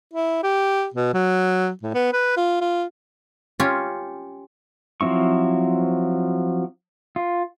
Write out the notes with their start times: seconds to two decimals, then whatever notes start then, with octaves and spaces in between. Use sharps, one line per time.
0.14 E4
0.43 G4
0.94 B2
1.14 F#3
1.83 A2
1.95 B3
2.13 B4
2.37 F4
2.61 F4
3.60 C#4 F4 G4 C#5
5.01 F3 F#3 C4 E4 C#6
7.16 F4